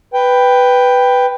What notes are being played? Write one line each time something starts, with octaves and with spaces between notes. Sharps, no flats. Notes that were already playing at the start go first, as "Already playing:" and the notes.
B4 G5